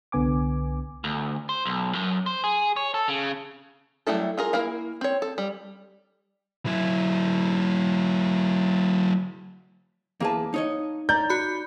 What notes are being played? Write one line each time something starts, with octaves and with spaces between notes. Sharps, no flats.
C2 D3 B3 G#5 D6
D2
C5
B1
F#2
C5
G#4
C#5
A4
C#3
F#3 G3 A3 E4 A4
F4 G#4 A#4
A#3 E4 A#4 F5
C4 C#5
A4
G3
F#3 E4
E2 A#3 G#4 B4 A5
D#4 C#5 D#5
D5 A#5 G6
F#4 B5